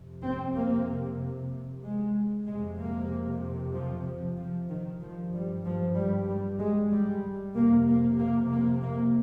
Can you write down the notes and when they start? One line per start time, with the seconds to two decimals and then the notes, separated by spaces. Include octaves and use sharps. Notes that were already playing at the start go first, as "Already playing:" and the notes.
Already playing: F2 C3
0.24 C4
0.55 A#3
1.83 G#3
2.46 F2 C3 G#3
2.78 A#3
3.74 F3
4.06 F3
4.37 F3
4.69 D#3
5.01 G2 F3
5.33 G3
5.65 F3
5.96 G3
6.28 G3
6.60 G#3
6.92 G3
7.56 F2 C3 A#3
7.87 A#3
8.19 A#3
8.51 A#3
8.83 A#3